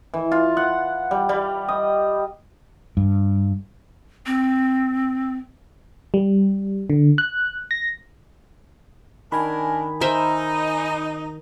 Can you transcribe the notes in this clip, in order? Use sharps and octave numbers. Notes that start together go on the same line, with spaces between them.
E3
F4
F#5
G3
G3
D#5
G2
C4
G3
D3
F#6
A#6
D#3 D4 A#4 G#5 B5
D#4 A#4 C5 E5